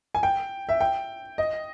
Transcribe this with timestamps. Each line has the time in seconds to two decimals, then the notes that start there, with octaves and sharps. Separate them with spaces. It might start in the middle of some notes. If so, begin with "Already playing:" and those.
0.15 G#5
0.23 G5
0.69 E5
0.81 G5
1.38 D#5